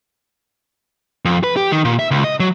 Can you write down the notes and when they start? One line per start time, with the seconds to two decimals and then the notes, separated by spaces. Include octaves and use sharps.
1.25 F2
1.44 B4
1.57 G4
1.72 D#3
1.85 A#2
1.99 E5
2.11 C#2
2.24 D#5
2.40 F#3